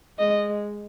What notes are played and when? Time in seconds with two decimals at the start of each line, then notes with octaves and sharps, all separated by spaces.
0.19 G#3 D#5